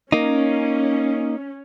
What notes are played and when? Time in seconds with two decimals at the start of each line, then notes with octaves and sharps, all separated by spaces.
0.12 A#3 C#4 D#4